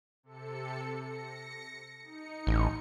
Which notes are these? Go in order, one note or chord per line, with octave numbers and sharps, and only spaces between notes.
C3 A4 C#7
A#6 C#7
D#4 C#7
A1